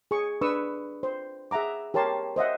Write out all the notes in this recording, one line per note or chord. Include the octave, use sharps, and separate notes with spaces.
G#4 C#6
D4 B4 C#6 D#6 E6
C5
G#4 E5 F#5 A#5 D6
G4 A#4 C#5 A5 C6
C5 D#5 E5 F#5